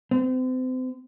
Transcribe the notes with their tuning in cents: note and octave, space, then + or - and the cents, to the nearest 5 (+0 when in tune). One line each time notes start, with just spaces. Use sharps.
C4 -35